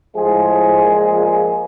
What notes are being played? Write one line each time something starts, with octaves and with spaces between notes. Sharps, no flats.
A2 F3 G#3 G#4
A#2
F3